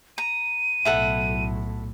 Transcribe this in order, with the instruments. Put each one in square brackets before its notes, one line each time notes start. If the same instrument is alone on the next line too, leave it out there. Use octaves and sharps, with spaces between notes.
[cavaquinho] A#5 [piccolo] D#7
[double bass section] B1 A2 [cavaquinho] E4 A4 F#5